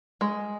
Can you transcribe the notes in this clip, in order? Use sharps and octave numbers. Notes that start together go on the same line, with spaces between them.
G#3